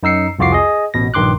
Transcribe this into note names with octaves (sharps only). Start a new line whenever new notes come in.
F#2 D#4 E6 C7 C#7
C2 F2 F4 F#4 D6 C7
G#4 D#5
A1 B2 A#6
A#1 G2 D#3 C6 D6 F#6